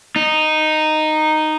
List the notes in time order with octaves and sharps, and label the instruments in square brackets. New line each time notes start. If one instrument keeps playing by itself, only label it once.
[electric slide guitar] D#4